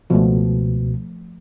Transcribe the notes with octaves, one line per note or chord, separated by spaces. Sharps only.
C#2 B2 F3 A3